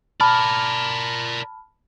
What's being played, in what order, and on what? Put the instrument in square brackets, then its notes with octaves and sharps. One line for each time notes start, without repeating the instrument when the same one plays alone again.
[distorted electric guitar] A#4 D5 [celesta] A5 B5 F6